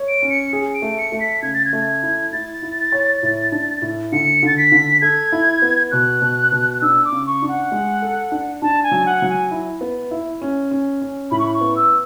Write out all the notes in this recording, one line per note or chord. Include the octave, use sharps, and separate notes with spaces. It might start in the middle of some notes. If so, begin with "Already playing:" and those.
Already playing: C#5
D7
C#4
C#7
G#4
D7
A3
C#7
A3
B6
C#3 G#6
A6
G#6
A3
E4
E4 A6
E4
C#5
A2
D4
A2
D3 C#7
D3 A6
B6
D3
A4 G#6
E4
B3
B2 F#6
B2
B2
F#6
D4 E6
D6
C#3
C#6
D4
F#5
G#3
A4
D4
D4 A5
G#5
F#3
F#5
F#3
G#5
E4
B3
E4
C#4
C#4
C#4
A2 B5
C#6
B5
C#6
B3
E6